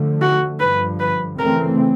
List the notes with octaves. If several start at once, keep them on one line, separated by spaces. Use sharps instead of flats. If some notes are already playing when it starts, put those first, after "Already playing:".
Already playing: D3 F3 A3
F#4
G2 D3 F3 B4
B4
C#3 E3 A3 C4 A#4